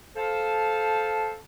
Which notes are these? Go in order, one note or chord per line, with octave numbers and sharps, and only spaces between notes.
A4 C5 F5 A5